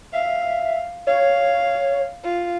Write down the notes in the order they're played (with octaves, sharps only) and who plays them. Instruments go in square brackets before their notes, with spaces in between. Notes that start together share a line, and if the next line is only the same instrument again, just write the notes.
[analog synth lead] E5 [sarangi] F5
[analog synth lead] C#5 [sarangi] F5
[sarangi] F4